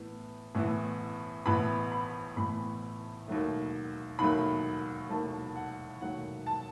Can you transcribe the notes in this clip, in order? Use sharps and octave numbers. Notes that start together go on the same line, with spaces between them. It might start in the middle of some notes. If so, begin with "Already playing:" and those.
Already playing: A2 E3 B3
A1 A2 E3 B3 E4
A1 A2 E3 B3 E4 B5
B5
A1 A2 E3 B3 E4 B5
E1 D#2 D#3 F#3 A3
E1 D#2 D#3 F#3 A3 B5
E1 D#2 D#3 F#3 A3 A5
F#5
E1 D#2 D#3 F#3 A3 F#5
A5